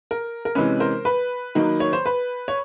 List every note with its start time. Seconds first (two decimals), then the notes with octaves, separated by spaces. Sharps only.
0.11 A#4
0.45 A#4
0.55 C3 E3 G#3 C#4 B4
0.80 A#4 C5
1.05 B4
1.55 D#3 F#3 A#3 D#4
1.80 C#5
1.93 C5
2.06 B4
2.48 C#5